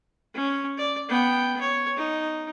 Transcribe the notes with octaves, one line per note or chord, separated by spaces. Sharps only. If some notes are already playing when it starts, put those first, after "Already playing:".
C#4
D5
B3 G5
C#5
D#4